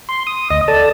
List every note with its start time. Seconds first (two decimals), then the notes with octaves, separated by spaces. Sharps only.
0.09 C6
0.27 D#6
0.50 D2 D#5 D#6
0.68 A4 D5 A5